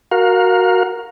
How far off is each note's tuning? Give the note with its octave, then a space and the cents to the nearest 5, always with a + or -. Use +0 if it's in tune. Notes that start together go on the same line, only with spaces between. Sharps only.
F#4 +0 A#4 +0 F5 +25